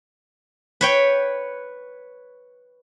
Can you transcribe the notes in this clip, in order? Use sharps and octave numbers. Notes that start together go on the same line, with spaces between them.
B4 C#5 G5